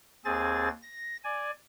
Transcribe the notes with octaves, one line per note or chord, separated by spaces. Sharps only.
D#2 C4 G#4 G#5 A6
A#6
D5 G#5